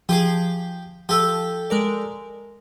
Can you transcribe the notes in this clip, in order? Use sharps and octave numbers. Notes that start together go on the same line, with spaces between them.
F3 G4 G#4 D6
F3 G4 A4
G#3 A#4 D5